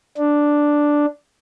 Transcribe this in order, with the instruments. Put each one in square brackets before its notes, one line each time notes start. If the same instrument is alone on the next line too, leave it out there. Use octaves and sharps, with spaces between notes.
[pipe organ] D4